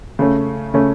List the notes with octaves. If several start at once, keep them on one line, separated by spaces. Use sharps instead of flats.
C#3 A3 C#4
C#3 A3 C#4